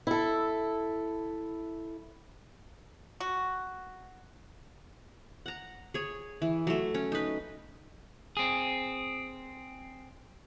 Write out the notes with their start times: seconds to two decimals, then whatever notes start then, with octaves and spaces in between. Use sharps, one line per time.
0.07 E4 A4
3.20 F#4
5.46 F#5 A#5
5.94 G#4 C#5
6.42 E3
6.67 F#3 A3
6.94 C#4
7.12 D#4 B4
8.37 C4 G#4